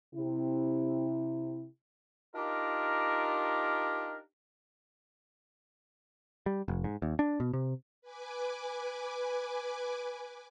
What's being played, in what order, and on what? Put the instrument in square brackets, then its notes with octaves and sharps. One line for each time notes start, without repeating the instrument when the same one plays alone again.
[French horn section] C3 E4
[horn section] D4 D#4 F4 G4 A#4
[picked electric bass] G3
F1
G#2
D#2
D4
B2
C3
[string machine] B4 G#5 D6